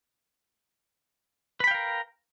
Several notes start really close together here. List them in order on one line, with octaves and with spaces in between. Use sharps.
B4 B5 G5 F5 A#4